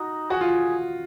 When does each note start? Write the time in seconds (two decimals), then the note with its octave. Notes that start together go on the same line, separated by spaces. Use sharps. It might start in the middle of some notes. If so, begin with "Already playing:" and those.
Already playing: D#4 F#4
0.30 F#4 G#4
0.41 F4